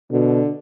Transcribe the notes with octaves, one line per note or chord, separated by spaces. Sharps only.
B2 D3